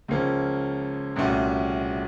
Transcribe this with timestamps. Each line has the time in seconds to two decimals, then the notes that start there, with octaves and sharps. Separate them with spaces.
0.08 C#2 C#3 F3 A#3 C#4
1.16 C2 A#2 A3 C#4 F#4